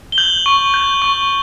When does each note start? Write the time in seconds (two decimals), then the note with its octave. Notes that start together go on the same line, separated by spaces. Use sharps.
0.12 G7
0.18 G6 F#7
0.46 C#6
0.74 G6
1.02 C#6